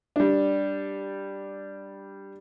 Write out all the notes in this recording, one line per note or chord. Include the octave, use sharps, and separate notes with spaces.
G3 D4